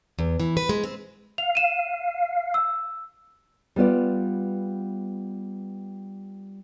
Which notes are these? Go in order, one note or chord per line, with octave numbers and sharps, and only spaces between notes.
E2
E3
B4
G#3
C4
F5 F7
D#7 E7
E6
G3 B3 F4 D5